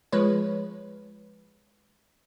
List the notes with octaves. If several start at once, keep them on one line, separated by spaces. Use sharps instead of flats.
F3 G#3 B4 C#5